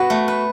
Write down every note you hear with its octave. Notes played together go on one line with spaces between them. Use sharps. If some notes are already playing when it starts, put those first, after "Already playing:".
Already playing: B3 F#4 B4
A3
B4